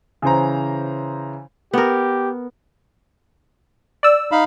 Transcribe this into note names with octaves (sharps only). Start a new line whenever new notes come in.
C#3 E3 C5 A#5
B3 G4 A#4
D5 E6
D#4 F5 B5